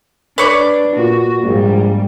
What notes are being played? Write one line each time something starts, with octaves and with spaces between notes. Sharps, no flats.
D4 B4 C#5 D5
A#2 F#4
A#1 G#2 G3